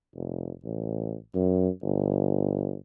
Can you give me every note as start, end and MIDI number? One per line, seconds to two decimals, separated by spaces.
0.15 0.52 29
0.64 1.15 33
1.35 1.69 42
1.83 2.76 31